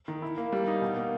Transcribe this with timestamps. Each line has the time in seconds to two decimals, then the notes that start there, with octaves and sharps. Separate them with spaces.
0.08 D#3
0.22 E4
0.38 A#3
0.52 G3
0.68 D#4
0.82 B2
0.97 A#3